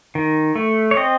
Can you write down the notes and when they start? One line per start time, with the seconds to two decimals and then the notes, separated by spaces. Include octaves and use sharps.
0.15 D#3
0.56 A3
0.91 C#5
0.97 C4 D#5